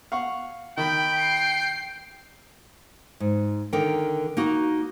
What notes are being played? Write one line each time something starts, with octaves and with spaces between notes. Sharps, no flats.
F5 F#5 C#6
D#3 G5 B5
C7
G#2
D3 D#3 A#4 G5
A#3 D#4 F#4